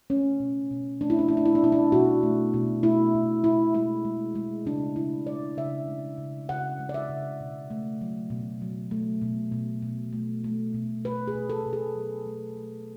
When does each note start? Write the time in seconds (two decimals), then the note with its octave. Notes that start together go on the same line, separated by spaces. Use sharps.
0.10 A3 C#4
0.40 B2
0.71 B2
1.01 A3 D4
1.10 E4
1.19 D4
1.28 A3 E4
1.37 D4
1.45 E4
1.55 D4
1.63 B2 E4
1.72 D4
1.92 B2 F#4
2.23 A3
2.54 B2
2.83 A3 E4
3.15 B2
3.44 B2 E4
3.75 G#3 E4
4.05 G#3
4.35 G#3
4.66 C#3 D4
4.96 C#3 E4
5.27 G#3 D5
5.57 C#3 E5
5.88 G#3
6.18 C#3
6.49 C#3 F#5
6.79 G#3
6.89 D5
6.94 E5
7.09 C#3
7.40 B2
7.70 A3
8.01 F#3
8.30 B2
8.62 F#3
8.91 A3
9.21 B2
9.52 B2
9.82 B2
10.13 A3
10.44 A3
10.74 B2
11.04 B2 B4
11.28 G#4
11.34 B2
11.50 A4
11.66 B2
11.73 G#4
11.95 F#3
12.26 A3
12.57 A3